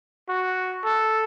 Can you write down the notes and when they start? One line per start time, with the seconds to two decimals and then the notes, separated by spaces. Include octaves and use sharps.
0.29 F#4
0.84 A4